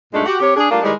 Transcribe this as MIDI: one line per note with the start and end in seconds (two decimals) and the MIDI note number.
0.13 0.22 43
0.13 0.22 46
0.13 0.22 56
0.13 0.22 57
0.13 0.22 62
0.13 0.22 63
0.25 0.38 66
0.25 0.38 67
0.40 0.55 48
0.40 0.55 67
0.40 0.55 73
0.55 0.66 62
0.55 0.66 68
0.70 0.81 55
0.70 0.81 57
0.70 0.81 58
0.70 0.81 62
0.70 0.81 65
0.83 0.92 51
0.83 0.92 52
0.83 0.92 55
0.83 0.92 56